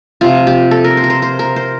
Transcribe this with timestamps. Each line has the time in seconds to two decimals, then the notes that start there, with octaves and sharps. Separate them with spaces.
0.21 C3 F3 C4 F4
0.47 G4
0.71 A4
0.84 A#4
0.97 C5
1.04 A#4
1.10 C5
1.22 C5
1.39 A#4
1.56 C5